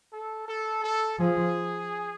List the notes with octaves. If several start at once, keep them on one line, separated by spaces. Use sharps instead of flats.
A4
A4
A4
F3 G#4